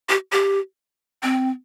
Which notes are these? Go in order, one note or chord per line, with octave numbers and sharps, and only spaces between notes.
G4
G4
C4